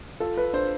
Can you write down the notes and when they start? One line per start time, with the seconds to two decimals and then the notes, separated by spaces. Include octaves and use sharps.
0.20 F4 A4
0.37 B4
0.53 D4 C5